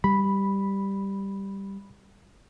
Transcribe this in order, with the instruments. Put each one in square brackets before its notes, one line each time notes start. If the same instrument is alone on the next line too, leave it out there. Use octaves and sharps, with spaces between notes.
[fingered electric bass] G3 [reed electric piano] B5